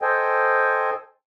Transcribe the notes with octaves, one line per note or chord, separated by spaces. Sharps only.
A4 C5 D#5 G5 G#5